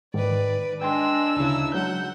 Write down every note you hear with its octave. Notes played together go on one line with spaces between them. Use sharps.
G#2 D#3 B4 D5
G#3 D4 G5 C6 E6
D2 C#3 D#4 E4
F#3 G#3 F#5 G6